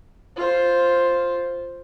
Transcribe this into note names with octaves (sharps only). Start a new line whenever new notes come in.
F4 C5